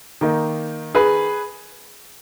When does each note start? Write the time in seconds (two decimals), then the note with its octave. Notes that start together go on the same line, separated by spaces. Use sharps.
0.21 D#3 A#3 D#4
0.95 G#4 B4